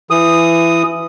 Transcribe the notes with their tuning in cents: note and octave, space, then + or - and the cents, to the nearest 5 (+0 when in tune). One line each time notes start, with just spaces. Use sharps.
E3 +20 D#6 -5